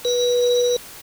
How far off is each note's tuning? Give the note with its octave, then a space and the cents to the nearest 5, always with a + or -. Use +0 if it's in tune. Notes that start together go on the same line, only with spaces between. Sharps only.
B4 -25